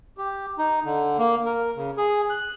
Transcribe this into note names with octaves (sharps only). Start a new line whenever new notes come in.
G4
D#4
D3
A#3
A#4
C#3
G#4
F#6